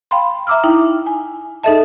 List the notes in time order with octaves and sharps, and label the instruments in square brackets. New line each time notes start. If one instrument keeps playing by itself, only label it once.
[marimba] F5 G5 B5 C6
E5 A#5 D6 E6 F6
D#4 E4 G5
G#5
D#4 G#4 A4 D#5 E5 A5